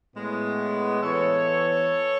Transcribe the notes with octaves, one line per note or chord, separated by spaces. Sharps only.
A2 G#3 B3
E3 B3 A4 C#5